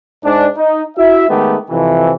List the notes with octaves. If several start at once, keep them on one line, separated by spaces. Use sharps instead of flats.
G#2 D4
D#4
E4 F#4 E5
D#3 G#3 A3 B3 G4
F2 C3 E3